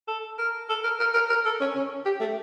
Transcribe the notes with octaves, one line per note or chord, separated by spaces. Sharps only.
A4
A#4
A4
A#4
A#4
A#4
A#4
A4
C#4
C#4
G4
A3